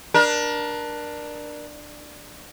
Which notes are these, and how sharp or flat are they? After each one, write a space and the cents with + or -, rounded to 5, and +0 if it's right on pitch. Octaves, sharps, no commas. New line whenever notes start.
D4 +15 A#4 +30